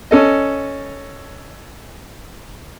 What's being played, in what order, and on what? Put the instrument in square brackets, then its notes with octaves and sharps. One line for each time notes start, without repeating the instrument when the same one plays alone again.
[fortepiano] C#4 A4 D#5